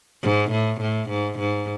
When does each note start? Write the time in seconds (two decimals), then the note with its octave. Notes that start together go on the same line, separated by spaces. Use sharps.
0.23 G#2
0.51 A2
0.81 A2
1.10 G#2
1.39 G#2